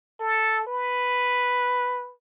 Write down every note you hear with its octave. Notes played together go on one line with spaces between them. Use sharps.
A4
B4